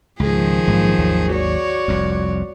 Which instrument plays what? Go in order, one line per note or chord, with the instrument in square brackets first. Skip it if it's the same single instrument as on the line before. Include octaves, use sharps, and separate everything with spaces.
[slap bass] C#2 G#2 [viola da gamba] D#3 F3 G#4
[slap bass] A#1 G#2 F#3
G#1 D#2 F#3
[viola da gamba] F#4 C#5 D5
[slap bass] F1 C2 F2